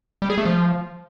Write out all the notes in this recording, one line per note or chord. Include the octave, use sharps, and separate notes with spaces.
G3
G#4
A3
F3